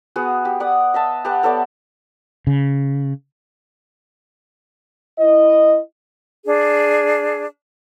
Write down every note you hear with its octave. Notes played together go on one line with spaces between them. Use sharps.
B3 F#4 G#4
G4
D5 F#5 D#6
D#5 E5 A5
G4 B4 F#5 A5
B3 A4 C#5 D5
C#3
E4 D#5
D4 G#4